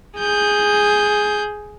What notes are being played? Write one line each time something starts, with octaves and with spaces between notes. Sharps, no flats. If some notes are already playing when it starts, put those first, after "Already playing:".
G#4 G6